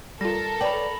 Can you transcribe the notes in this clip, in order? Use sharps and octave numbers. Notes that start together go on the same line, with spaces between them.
G3 F4 A4 A#4 A#6
B4 C#5 D5 G5 B5 F#7